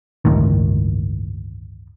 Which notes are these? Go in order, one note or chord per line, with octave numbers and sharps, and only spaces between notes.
G1 C#2 A2 D#3